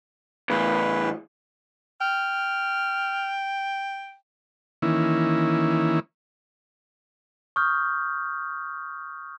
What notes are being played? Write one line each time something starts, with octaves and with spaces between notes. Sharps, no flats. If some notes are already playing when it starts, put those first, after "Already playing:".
E2 A2 B4
G5 F6
D#3 E3 A#3 C#4 E4
C#6 D#6 F6 G6